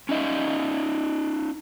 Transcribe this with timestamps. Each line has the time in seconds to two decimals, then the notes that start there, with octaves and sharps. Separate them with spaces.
0.09 C#4 D#4 D#5 F5